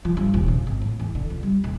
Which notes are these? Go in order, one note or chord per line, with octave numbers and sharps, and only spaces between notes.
F3
G2
D#1
C#3
G#1
A2
E2
D3
C#2
G3
D#1